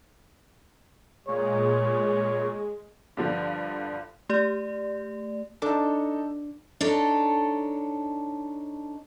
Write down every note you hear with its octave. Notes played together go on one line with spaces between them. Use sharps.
A#2 G#3 C#5
G2 D3 F3
A3 G4 D5
D4 D#4 A4
D4 D#4 A4 C#5